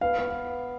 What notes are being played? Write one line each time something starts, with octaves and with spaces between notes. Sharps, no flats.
B3 F5
B3